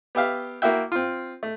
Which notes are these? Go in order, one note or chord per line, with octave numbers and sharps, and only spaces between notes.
B3 G4 E5 F5
A#3 E4 F#4 E5 G5
C4 F4
A3